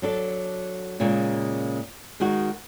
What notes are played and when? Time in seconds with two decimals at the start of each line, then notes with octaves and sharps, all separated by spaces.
0.02 F#3 D4 A4
1.00 A#2 C#3 G#3 A#3
2.20 D#3 G#3 D#4 F#4